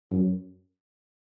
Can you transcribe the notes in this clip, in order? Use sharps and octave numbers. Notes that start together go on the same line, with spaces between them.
F#2